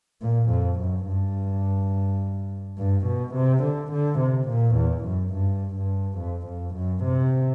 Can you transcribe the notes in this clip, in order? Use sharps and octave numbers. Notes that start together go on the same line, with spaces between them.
A#2
F2
F#2
G2
G2
B2
C3
D3
D3
C3
A#2
E2
F#2
G2
G2
F2
F2
F#2
C3